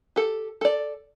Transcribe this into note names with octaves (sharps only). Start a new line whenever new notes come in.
G4 A4
A4 D5